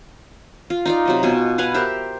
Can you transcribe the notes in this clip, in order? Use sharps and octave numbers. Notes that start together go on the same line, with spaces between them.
F4
D#4 F4 D5
C3 F#3 D#5
B2 F4 G#5
B4 F5 F#5 G#5
G4 A#4 C5 E5